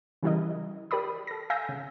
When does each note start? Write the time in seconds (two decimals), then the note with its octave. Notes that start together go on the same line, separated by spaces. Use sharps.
0.23 C#3 E3 G3 E4 A#4 D#5
0.91 G4 A#4 D5 B5 D#6
1.27 A4 A#6
1.50 E5 F5 G#5 E6 G6 A#6
1.69 C#3